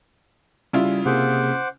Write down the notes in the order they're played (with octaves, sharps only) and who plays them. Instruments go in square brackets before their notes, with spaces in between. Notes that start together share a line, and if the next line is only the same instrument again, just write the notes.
[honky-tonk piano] C#3 E4 F4 [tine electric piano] G3
[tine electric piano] C3 A#3 G#4 [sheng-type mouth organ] C5 F#5 D6